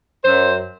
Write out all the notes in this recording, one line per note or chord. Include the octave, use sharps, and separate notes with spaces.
F#2 C5